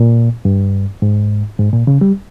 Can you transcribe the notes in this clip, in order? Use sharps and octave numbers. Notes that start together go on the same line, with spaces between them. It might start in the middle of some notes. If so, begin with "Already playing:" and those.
Already playing: A#2
G2
G#2
G#2
A#2
C#3
G3